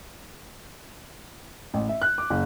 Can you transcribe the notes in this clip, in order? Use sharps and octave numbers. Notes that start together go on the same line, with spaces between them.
A1
E5
F#6
D6
F#1